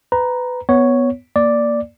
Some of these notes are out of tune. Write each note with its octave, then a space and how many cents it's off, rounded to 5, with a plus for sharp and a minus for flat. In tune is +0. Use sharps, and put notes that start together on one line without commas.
B4 +20 A#5 +10
B3 +0 C#5 +0
A#3 +0 D5 +0